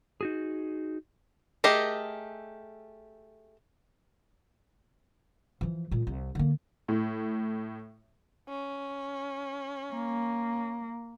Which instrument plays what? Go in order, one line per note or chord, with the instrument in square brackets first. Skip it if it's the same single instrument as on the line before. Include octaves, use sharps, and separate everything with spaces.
[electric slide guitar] D#4 F#4 G#4
[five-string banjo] A3 G4 G#4 A#4 D#5
[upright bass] E3 F3
A#2 G#3
C2
D3 A#3
[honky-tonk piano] A2
[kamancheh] C#4
[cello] A#3